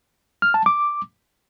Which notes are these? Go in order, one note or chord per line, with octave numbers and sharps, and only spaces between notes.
F6
A5
D6